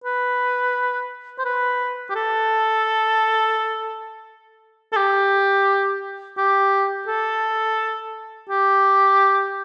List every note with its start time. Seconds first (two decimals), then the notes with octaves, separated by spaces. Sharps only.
0.04 B4
1.39 C5
1.45 B4
2.09 G4
2.15 A4
4.92 A4
4.96 G4
6.38 G4
7.07 A4
8.49 G4